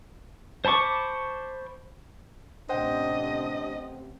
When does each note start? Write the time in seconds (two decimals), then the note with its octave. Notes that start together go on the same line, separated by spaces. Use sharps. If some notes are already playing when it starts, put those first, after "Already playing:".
0.65 C5 A5 B5 C#6 D6
2.69 A1 C3 D4 C5 D#5 F#5 G5